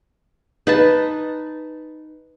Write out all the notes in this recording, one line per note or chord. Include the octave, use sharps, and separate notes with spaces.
D#4 B4 A5